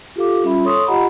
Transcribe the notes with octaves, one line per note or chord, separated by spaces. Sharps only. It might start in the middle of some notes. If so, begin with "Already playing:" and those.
F4 G4 A4 F5 D6
G3 C#4 F4 E5 B5
A4 C#5 C6 C#6 D#6
F4 G4 D#5 F#5 A#5 B5